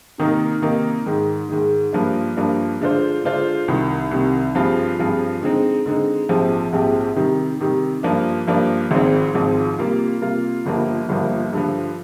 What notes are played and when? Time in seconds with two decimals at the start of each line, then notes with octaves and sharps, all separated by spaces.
0.18 C3 D#3 A#3 D#4 A#4
0.62 C3 D#3 A#3 D#4 A#4
1.06 G#2 D#3 G#3
1.49 G#2 D#3 G#3
1.93 G2 F3 A#3 D4
2.37 G2 F3 A#3 D4
2.81 D3 G#3 D4 F4 C5
3.24 D3 G#3 D4 F4 C5
3.68 C2 C3 D#3
4.11 C2 C3 D#3
4.55 G2 F3 C4 F4 G#4
4.99 G2 F3 C4 F4 G#4
5.41 D3 G#3 C4 D#4
5.86 D3 G#3 C4 D#4
6.29 A#1 G#2 F3 C4 G4
6.73 A#1 G#2 F3 C4 G4
7.16 C3 D#3 G3
7.60 C3 D#3 G3
8.03 G2 F3 A#3 D4
8.47 G2 F3 A#3 D4
8.91 G#1 G#2 F3 C4
9.35 G#1 G#2 F3 C4
9.78 C3 G3 A#3 F4
10.22 C3 G3 A#3 F4
10.66 G1 G2 F3 A#3
11.09 G1 G2 F3 A#3
11.53 G2 D3 F3